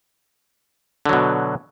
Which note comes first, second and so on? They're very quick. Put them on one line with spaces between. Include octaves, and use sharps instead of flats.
D3 F#3 B2